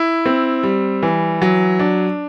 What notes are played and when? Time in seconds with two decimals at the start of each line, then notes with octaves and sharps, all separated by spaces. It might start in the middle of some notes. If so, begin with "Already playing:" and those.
Already playing: E4
0.26 C4
0.63 G3
1.03 E3
1.42 F#3
1.79 D4